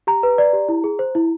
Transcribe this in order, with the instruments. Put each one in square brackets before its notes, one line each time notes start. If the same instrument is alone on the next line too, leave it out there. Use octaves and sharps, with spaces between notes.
[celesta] G4 A#5
B4
D5
G4
E4
G#4
C5
E4